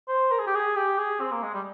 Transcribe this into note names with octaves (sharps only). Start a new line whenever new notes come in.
C5
A#4
G#4
G4
G#4
G4
G#4
C4
A#3
G#3
G3